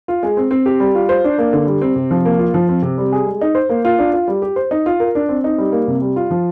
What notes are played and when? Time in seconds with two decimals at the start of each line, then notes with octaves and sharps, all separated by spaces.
0.08 F4
0.23 G#3
0.37 C4
0.51 C4
0.66 G4
0.80 G3
0.95 F4
1.09 C5
1.24 D4
1.38 A#3
1.53 D3
1.67 G3
1.81 C4
1.96 C3
2.11 F3
2.25 A#3
2.39 F4
2.54 F3
2.69 C4
2.82 C3
2.98 G3
3.12 G#4
3.27 G#3
3.41 D#4
3.55 C5
3.69 A#3
3.85 F4
3.99 D4
4.13 F4
4.28 G3
4.42 G4
4.56 C5
4.71 D#4
4.86 F4
5.00 A#4
5.15 D4
5.29 C4
5.44 D#4
5.58 G3
5.72 A#3
5.88 C3
6.02 G3
6.16 F4
6.31 F3